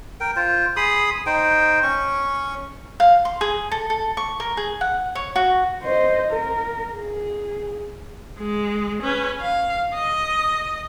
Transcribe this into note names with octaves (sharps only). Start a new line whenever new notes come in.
A#4 G5
F4 C5
G#4 B5 C6 D#6
D#4 C5 G5
C#4 C#6
F5
C6
G#4
A4
A4
C#6
A#4
G#4
F#5
C#5
F#4
C5 D#5
A#4
G#4
G#3
C#4 B4
F5
D#5